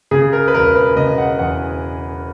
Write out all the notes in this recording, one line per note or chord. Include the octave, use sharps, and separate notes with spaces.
C#3 G#4
A#4
B4
E1 A#4
B4
C#3 D#5
F#5
E2 F#5